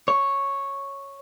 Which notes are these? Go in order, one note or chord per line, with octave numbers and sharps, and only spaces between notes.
C#5